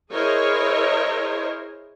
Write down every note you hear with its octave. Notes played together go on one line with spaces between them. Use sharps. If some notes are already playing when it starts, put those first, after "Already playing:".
E4 G#4 A#4 C5 C#5 D#5